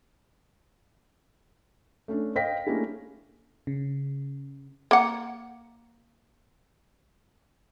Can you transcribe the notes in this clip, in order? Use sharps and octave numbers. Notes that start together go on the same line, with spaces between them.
A3 C#4 D4
C5 D#5 F5 G5 A#6 B6
A3 A#3 C#4 D4 E4 G#4
C#3
A#3 F#5